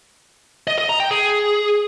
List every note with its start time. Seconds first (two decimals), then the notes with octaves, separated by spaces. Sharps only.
0.68 D#5
0.78 D#5
0.89 A#5
1.00 G5
1.11 G#4